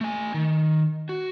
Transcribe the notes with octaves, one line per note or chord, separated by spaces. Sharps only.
A3 G#5
D#3
F#4